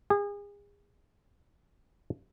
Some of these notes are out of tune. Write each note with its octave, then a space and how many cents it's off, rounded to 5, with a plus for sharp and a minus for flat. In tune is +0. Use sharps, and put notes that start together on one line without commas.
G#4 -35